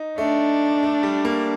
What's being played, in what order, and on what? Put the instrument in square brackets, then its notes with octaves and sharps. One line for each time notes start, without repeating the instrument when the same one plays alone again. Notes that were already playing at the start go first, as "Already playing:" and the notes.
Already playing: [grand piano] D#4
[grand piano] A3 [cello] D4
[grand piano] A3
G3
A#3